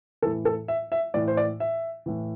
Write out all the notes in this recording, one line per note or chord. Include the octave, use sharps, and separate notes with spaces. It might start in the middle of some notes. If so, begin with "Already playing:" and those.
A2 E3 A4
A4
E5
E5
A2 E3 D5
C5
D5
E5
A2 E3